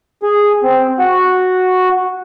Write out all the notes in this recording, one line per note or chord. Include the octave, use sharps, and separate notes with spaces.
G#4
C4
F#4